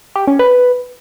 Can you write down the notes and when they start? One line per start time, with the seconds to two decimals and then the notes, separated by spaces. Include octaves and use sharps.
0.16 G4
0.27 C#4
0.39 B4